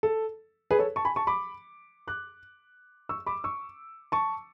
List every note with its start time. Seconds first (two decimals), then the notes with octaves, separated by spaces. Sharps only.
0.03 A4
0.71 G#4 B4
0.79 A4 C#5
0.96 A5 C#6
1.05 G#5 B5
1.16 A5 C#6
1.27 B5 D6
2.07 D6 F#6
3.09 C#6 E6
3.26 B5 D6
3.44 C#6 E6
4.12 A5 C#6